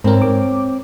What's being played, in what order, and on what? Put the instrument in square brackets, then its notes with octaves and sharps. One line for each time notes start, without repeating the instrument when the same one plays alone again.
[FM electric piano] G#2 A#4 [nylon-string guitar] C4 C#5
[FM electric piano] D6